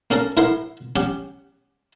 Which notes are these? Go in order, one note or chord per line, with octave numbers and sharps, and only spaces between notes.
A#3 C#4 A4 A#4
A2 E4 A#4 B4 F#5 C6
C#4 G4 F#5